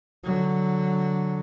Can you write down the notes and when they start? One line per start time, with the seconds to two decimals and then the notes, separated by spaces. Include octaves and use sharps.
0.24 D3 F#3